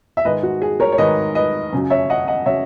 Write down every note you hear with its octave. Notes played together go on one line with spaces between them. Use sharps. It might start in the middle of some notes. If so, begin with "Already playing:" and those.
E5
G#2 D#3 G#3 B4 D#5
F#4
G#4
A#4 C#5
C#5
G#2 D#3 G#3 B4 D#5
B4 D#5
F#2 C#3 F#3
C#5 E5
D#5 F#5
D#5 F#5
C#3 F#3 C#5 E5